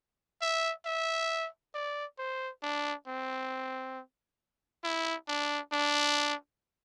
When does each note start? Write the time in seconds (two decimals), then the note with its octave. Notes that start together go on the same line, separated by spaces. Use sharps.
0.41 E5
0.86 E5
1.74 D5
2.19 C5
2.63 D4
3.07 C4
4.84 E4
5.28 D4
5.72 D4